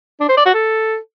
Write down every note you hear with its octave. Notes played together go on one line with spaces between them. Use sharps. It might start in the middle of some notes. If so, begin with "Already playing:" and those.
D4
C5
D5
F#4
A4